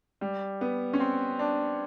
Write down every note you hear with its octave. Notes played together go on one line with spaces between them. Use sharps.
G3
B3
C#4
C4
D4